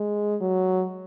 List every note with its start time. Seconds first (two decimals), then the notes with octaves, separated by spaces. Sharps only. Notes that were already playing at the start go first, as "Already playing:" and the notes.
Already playing: G#3
0.41 F#3